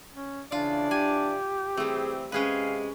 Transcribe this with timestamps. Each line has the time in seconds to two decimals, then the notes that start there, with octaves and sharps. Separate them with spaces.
0.15 C#4
0.52 C#3 E3 D4 F4 D5
0.91 G4 G#5
1.77 E3 G3 A3 C4 G#4
2.32 C3 G#3 C#4 G#4 B4 F5